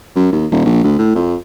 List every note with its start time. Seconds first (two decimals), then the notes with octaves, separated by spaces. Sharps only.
0.15 F#2
0.32 D#2
0.51 D#1
0.65 A#1
0.84 D2
0.99 A2
1.15 F2